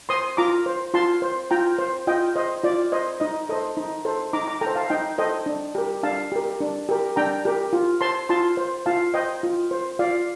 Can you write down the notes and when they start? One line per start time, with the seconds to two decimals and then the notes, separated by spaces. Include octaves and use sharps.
0.09 C5 C6 D#6
0.37 F4 A#5 D6
0.66 C5
0.94 F4 A5 C6
1.22 C5
1.51 F4 G5 A#5
1.79 C5
2.07 F4 D#5 G5
2.36 C5 D#5
2.64 F4 D5
2.92 C5 D#5
3.20 D#4 D#5
3.49 A4 C5 D#5
3.77 D#4
4.05 A4 C5
4.33 D#4 A#5 D6
4.47 A#5 D6
4.61 A4 G5 A#5
4.66 C5
4.75 F5 A5
4.90 D#4 D#5 G5
5.18 A4 C5 D#5 G5
5.46 D4
5.75 G4 A#4
6.03 D4 F5 A5
6.32 G4 A#4
6.60 D4
6.89 G4 A#4
7.16 D4 G5 A#5
7.45 G4 A#4
7.73 F4
8.01 C5 A5 C6
8.29 F4 A5 C6
8.57 C5
8.86 F4 F5 A5
9.14 C5 D#5 G5
9.43 F4
9.71 C5
9.99 F4 D5 F5